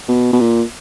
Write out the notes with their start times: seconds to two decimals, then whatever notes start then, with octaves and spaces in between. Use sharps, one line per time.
0.08 B2
0.33 B2
0.40 A#2